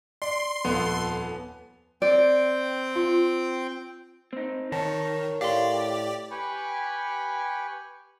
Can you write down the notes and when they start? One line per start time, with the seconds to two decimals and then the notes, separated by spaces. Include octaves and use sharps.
0.22 D5 C6
0.65 D#1 F2 B3 A4
2.02 C4 D5 G5
2.96 F4
4.33 C4 D#4
4.72 D#3 A#4 C#5 A5
5.41 A2 G4 D5 F5 C6
6.31 G4 B4 G5 G#5 B5 C#6